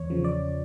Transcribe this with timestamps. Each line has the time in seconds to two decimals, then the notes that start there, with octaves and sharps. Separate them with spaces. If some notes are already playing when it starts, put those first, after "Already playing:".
Already playing: E2 C#5
0.10 C#3 F3
0.25 D5